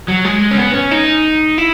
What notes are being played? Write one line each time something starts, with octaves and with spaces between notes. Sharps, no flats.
F#3
G#3
C#4
B3
C#4
D#4
E4